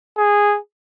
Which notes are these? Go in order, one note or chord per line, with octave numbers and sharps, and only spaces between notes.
G#4